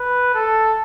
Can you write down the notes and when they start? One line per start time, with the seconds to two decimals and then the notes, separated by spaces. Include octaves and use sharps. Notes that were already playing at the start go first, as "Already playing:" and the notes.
Already playing: B4
0.34 A4